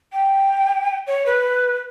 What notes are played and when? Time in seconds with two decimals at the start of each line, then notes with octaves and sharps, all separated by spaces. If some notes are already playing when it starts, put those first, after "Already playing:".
0.12 G5
1.07 C#5
1.26 B4